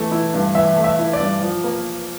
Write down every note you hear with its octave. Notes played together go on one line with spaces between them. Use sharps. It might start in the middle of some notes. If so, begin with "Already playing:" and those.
Already playing: E3 A3
E4
G2
E3 E5
A3
E5
E4
D5
G2
F3
A#3